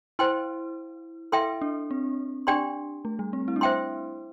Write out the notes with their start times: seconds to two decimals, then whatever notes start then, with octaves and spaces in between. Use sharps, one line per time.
0.19 E4 C5 G5 C6
1.32 E4 A4 E5 G5 C6
1.61 D4
1.91 C4
2.47 D4 G4 D5 G5 C6
3.05 A3
3.19 G3
3.33 C4
3.48 E4
3.56 D4
3.61 E4 C5 E5 G5 C6